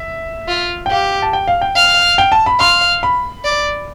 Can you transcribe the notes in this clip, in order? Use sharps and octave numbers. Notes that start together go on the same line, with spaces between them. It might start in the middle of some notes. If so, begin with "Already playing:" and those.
Already playing: E5
F4
G5
G4 F5
A5
G5
F5
G5
F5
G5
A5
B5
F5 C6
B5
D5